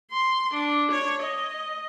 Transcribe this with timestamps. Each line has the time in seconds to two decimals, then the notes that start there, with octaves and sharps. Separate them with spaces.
0.11 C6
0.53 D4
0.91 C#5
1.22 D#5